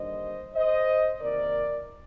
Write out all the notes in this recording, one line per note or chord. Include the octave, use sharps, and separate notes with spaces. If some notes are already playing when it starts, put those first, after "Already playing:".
Already playing: D#2 D3 G3 A#3 D4 C5 D#5
C5 D#5
C3 D#3 A#3 A#4 D5